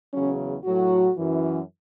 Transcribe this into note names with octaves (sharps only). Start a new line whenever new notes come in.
E2 C#3 F#3 C#4
A2 F#3 F#4
F#2 E3